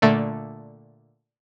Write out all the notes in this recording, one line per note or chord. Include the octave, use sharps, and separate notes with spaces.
A#2 D3 A3